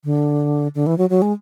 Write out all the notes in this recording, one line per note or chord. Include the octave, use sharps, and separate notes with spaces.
D3
D3
E3
F#3
F#3
G#3